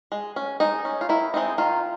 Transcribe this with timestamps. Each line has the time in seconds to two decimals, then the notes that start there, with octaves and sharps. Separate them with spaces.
0.12 G#3
0.36 C#4
0.60 G#3 D#4
0.85 C#4
1.01 F4
1.09 D#3 E4
1.34 G#3 C4 D#4
1.58 D#3 F4